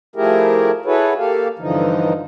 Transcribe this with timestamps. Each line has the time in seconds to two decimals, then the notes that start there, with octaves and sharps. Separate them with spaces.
0.16 F3 A3 E4 G4 G#4 A#4
0.85 E4 F#4 G#4 A4 B4 C#5
1.18 A#3 G4 A4 F5
1.59 G2 D3 E3 F3 D#4